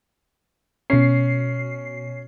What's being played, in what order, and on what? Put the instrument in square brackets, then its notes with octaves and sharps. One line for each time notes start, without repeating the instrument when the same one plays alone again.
[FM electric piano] B2 C7 [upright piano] C#4